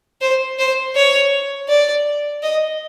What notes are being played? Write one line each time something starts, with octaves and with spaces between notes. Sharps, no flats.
C5
C5
C#5
D5
D#5